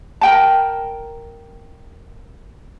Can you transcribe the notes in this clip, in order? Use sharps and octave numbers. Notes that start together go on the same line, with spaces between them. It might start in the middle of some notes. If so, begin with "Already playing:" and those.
A#4 G5 A5